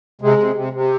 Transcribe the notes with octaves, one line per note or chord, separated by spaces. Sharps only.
C3 G#3
C3
C3
C3